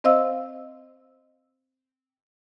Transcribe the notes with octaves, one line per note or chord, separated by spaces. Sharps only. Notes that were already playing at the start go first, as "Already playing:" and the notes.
C4 C5 D#5 F5 E6